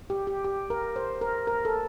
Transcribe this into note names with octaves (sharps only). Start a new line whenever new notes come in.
G4
G4
G4
A#4
C5
A#4
A#4
A4